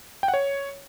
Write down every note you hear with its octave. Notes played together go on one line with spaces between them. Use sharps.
G5
F#5
C#5